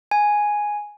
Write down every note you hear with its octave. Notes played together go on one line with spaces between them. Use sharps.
G#5